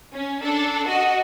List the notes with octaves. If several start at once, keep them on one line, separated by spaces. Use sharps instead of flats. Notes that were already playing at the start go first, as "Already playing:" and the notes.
C#4
D4 A4
F#4 D#5